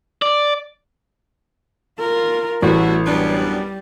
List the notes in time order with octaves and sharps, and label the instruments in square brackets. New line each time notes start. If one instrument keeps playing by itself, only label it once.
[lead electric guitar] D5
[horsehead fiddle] F4 A#4
[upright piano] A1 [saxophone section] G3 F#4 [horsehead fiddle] A3
[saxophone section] F#2 B3 D4 [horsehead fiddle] G3